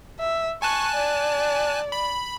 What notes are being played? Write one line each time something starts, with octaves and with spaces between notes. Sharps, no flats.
E5
G#5 A5 C#6 F#6
D5
B5